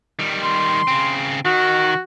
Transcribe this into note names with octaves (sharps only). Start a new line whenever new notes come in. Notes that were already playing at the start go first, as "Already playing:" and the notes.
D#3 G3
C6
C#3 C4
D#3 F#4